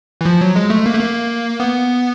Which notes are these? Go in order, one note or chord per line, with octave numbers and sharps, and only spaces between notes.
E3
F3
F#3
G#3
A3
A#3
A3
A#3
B3